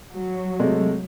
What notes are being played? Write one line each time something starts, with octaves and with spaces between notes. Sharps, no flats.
F#3
C3 G#3 A3